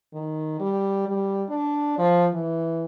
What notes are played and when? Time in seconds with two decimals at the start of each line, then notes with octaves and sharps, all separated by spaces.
0.13 D#3
0.60 G3
1.08 G3
1.49 D4
1.98 F3
2.33 E3